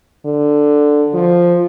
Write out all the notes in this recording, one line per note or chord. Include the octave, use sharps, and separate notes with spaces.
D3
F3